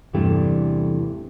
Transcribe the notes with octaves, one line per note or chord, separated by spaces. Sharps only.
E2 G2 C3 E3 G3 A3